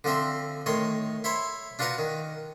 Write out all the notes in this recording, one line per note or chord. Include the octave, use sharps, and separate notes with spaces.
D3 F3 C4 C5 E5
A2 D#3 C#5 C6
E4 C5 C#5 B5 C6
D4 F4 F#4 B4 F#5 A#5
D#3